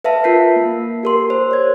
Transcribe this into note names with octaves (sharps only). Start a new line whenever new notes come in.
B4 E5 F5 A5
F4 A#4 A5 G6 B6 C7
A#3
G4 A#4 C6
C5
C#5 G#6